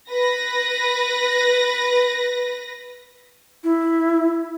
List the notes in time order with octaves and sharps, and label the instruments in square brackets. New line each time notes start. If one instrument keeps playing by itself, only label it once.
[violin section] B4 A#6
[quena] E4